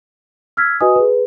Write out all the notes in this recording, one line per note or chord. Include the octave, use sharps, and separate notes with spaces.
E6 F6 G#6 B6
F#4 B4 D#5 G#5 D#6
G#4 B4